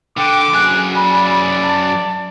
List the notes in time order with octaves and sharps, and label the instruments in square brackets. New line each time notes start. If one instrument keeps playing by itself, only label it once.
[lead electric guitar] D3 [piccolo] G5 [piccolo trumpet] D6
[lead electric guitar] F#2 G#4 [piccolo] F#6
[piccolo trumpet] D5 [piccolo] B5
[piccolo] A5